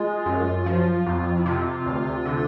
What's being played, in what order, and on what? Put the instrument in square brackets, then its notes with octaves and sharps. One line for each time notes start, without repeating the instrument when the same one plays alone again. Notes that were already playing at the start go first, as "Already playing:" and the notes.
Already playing: [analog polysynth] G#3 [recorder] F4
[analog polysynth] F#2
F3
F2
[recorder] E4
[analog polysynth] C3 [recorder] F4
[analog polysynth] D2
D3